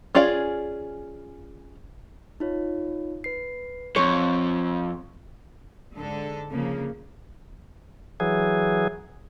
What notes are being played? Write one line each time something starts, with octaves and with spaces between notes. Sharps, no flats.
C#4 F4 G#4 D5 F5
D#4 F4 C#5
B4 C7
F2 C4 C#5 C6 C#6
G#2 D3 A4
C#3 F3 A#3
E3 F#3 G#4